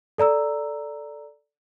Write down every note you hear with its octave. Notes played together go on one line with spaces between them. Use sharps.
A4 D5 A#5 E6